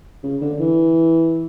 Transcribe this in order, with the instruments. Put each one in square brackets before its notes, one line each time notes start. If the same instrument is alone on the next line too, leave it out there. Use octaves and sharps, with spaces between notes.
[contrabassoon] C#3
D3
E3